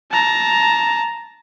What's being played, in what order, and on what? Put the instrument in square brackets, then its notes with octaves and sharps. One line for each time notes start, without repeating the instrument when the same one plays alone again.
[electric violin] A5 A#5